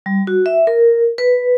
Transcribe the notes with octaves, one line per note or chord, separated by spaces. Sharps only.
G3
F#4
E5
A#4
B4